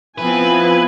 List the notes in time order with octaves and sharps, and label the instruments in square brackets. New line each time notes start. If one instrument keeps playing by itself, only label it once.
[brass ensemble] F3 E4 [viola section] B3 C4 G#5 [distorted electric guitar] B4